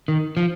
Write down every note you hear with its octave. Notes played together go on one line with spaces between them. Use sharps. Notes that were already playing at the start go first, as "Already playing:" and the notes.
D#3
F3